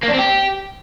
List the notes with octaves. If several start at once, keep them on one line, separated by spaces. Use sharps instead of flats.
A#3
D4
C4
G4